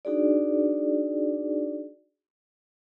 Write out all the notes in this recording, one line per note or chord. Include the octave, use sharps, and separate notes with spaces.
D4 D#4 F#4 G#4 D5